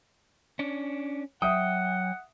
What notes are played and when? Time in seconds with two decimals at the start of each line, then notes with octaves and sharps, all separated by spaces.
0.59 C#4 D4
1.42 F#3 E5 F#5 G5 D#6